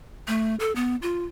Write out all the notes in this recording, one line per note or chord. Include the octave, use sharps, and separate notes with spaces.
A3
A4
B3
F4